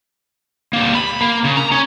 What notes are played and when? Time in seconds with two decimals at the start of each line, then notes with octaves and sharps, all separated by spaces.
0.73 G3 A#3
0.95 B5
1.21 A#3
1.44 C#3
1.57 A#5
1.72 C#4